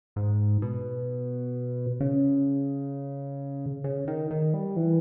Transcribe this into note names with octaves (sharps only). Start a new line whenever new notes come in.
G#2
B2
C#3
C#3
D#3
D#3
G3
E3